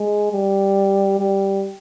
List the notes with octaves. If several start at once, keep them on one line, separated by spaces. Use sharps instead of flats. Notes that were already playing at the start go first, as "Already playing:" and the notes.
Already playing: G#3
G3
G3